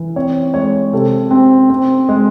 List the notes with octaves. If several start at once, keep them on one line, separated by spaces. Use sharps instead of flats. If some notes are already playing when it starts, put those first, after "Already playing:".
Already playing: E3
C4 C#5
G#3 C#5
C3 A4
C4
C4
G#3